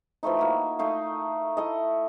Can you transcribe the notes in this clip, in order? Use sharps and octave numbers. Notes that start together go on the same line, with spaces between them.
E3 F3 A3 D#4
A#3 F#4
A3 D#4 F5
E4 A4 D#5